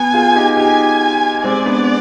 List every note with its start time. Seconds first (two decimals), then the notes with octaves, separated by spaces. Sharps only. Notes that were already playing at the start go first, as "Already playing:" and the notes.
Already playing: B3 G#5
0.14 F4 G#4
0.35 D#4 G4
0.57 D#4 G4 G#5
1.44 G#3 C4 D5
1.66 B3 D4